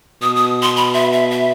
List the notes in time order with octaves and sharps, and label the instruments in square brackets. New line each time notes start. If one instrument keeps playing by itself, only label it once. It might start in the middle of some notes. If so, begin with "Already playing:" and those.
[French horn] B2 [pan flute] D#6
[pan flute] D#6
C6
B5
E5
E5
E5